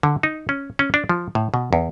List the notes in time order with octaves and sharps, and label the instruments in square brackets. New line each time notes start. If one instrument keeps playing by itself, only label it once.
[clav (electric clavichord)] D3
D#4
C#4
C#4
D4
F3
A2
B2
E2